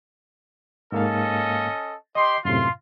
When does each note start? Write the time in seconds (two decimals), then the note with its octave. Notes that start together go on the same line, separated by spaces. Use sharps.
0.92 G#2 A#3 C#4 A4 D#5 F5
2.15 G4 D#5 C6
2.45 F#2 A2 C3 F4 C6